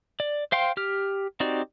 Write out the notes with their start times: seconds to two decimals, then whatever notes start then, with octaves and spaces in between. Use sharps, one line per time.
0.20 D5
0.52 C5 F5 G5 C6
0.77 G4 F6
1.40 C4 D#4 F#4 G4 D5